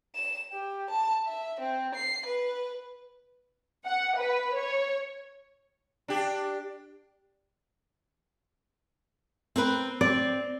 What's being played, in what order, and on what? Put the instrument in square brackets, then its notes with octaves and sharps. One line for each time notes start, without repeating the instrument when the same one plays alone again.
[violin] E7
G4
A5
E5
C4
C7
B4
[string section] F#5
B4
C#5
[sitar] D4 G4
[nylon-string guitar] C4 A#4 B4
[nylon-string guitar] C4 [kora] D5